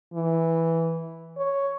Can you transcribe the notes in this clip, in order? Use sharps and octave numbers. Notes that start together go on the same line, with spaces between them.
E3
C#5